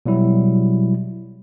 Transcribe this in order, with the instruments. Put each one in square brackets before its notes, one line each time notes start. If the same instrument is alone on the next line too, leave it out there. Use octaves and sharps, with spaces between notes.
[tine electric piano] B2 F#3 G3 E4